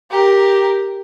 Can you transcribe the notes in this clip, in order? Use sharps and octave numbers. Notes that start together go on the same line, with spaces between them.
G4 A#4